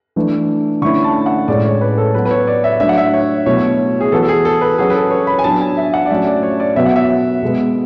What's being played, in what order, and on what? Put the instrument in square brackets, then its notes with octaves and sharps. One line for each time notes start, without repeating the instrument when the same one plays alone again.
[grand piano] E3 A3 D4
[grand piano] D3 A3 C#4 E4 [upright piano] C#6
[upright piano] A5
F#5
[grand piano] A2 G#3 C#4 [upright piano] D5
[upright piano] C#5
B4
A4
[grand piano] F#3 B3 F#4 [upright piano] B4
[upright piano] B4
C#5
D5
E5
[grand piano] F#3 A3 D4 [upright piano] E5
[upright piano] F#5
E5
C#5
[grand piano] B2 F#3 A3 E4 [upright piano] C#5
[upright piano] G#4
[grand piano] E3 B3 F#4 [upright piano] A4
[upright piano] A4
G#4
A4
B4
[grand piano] F#3 C#4 F#4 [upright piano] G#4
[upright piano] B4
A4
C#5
B5
G#5
[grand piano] F#3 B3 D4 F#4 [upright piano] A5
[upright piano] G#5
E5
F#5
D5
[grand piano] F#3 A3 C#4 F#4 [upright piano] E5
[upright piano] D5
C#5
D5
[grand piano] B2 F#3 B3 F#4 [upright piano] E5
[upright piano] F#5
E5
[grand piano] B2 G#3 B3